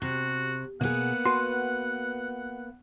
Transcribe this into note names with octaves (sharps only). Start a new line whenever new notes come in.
C3 F#4
B2 A#3 B3 G#4 F#5
F#4 B4 C6